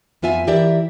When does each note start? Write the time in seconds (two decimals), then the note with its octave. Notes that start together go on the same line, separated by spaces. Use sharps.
0.22 F2 B3 F4 E5 G#5
0.47 E3 E4 G4 A#4 D5 E5